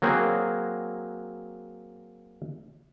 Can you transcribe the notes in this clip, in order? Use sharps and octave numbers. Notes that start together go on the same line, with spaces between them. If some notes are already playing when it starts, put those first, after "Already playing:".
F#3 A#3 C4 F#4 G#4